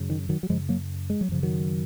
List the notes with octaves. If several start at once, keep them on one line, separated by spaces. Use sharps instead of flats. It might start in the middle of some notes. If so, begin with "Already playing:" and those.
Already playing: F#2 C#3
D#3
D#3 F#3
F#3
F#2 C#3 F3 G#3
F#3 A#3
G#3
F#3
F#2 C#3 F3
D#3 F#3